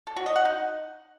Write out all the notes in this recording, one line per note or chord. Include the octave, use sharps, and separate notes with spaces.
A4
F#4
D#5
F#5
D#4